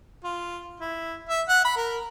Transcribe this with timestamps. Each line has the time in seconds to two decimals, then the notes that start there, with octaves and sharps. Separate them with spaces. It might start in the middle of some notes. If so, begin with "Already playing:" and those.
0.24 F4
0.80 E4
1.29 E5
1.49 F#5
1.65 B5
1.77 A#4